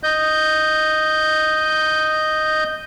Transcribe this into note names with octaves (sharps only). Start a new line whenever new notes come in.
D#5 G6